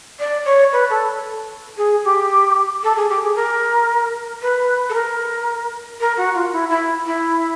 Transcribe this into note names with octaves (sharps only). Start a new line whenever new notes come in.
D5
C#5
B4
A4
G#4
G4
A4
G#4
G4
G#4
A#4
B4
A4
A#4
A#4
F#4
F4
E4
E4
E4